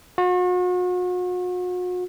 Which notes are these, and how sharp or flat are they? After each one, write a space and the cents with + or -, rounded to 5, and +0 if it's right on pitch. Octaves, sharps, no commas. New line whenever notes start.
F#4 -40